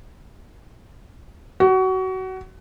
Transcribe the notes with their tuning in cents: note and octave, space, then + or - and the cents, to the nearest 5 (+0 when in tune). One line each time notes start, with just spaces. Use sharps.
F#4 +25